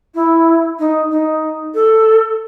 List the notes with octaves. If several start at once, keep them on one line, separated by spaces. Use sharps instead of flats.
E4
D#4
D#4
A4